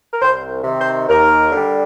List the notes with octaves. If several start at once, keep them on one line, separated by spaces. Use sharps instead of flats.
A#4
C2 C5
C3 D#3
C5
D#2 A#4
D3 G3